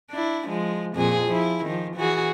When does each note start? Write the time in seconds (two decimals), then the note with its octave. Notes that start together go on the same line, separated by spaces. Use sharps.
0.11 D4 E4
0.48 F3 G#3
0.95 F2 A#2 G#4
1.26 F3 E4
1.65 D#3 F3
1.96 E3 F#4 G#4